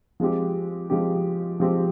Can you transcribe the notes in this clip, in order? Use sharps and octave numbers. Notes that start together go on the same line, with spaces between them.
F3 G#3 C4 G4
F3 G#3 C4 G4
F3 G#3 C4 G4